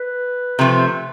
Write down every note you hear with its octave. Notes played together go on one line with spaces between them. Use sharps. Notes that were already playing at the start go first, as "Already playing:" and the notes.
Already playing: B4
C3 F3 A3